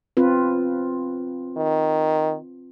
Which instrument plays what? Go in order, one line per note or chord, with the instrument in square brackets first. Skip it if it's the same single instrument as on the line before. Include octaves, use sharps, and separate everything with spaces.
[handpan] C4 F4 B4
[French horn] D#3